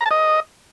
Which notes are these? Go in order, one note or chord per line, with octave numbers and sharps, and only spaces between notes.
A#5
A5
D#5